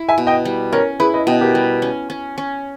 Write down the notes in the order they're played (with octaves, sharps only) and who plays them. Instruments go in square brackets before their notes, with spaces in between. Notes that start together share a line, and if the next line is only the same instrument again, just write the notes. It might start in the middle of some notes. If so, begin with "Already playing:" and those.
Already playing: [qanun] E4
[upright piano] E5 G#5
[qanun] B2
[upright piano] D#5 G5
[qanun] G3
[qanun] C#4 [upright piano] A#4 C#5
[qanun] E4 [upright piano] G#4 B4
[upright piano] B4 D#5
[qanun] B2 [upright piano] D#5 G5
[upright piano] G4 A#4
[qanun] G3
C#4
C#4
C#4